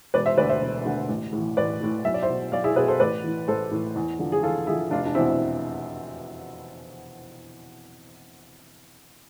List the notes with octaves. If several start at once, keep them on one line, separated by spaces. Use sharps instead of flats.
E1 B4 D5
C5 E5
D2 D3 B4 D5
C5 E5
E1
D2 D3
A1
A2 E3
A1 B4 D5
A2 E3
B1 E5
D5
C5 E5
B2
B1 D5 F5
E4 G#4
B2 G#4 B4
A4 C5
A1 B4 D5
A2 E3
A1 A4 C5
A2 E3
E2
D3 F3
G#4
E2 F4 A4
D3 F3 E4 G#4
F1 D4 F4
D4
E2 B2 C4 E4
E4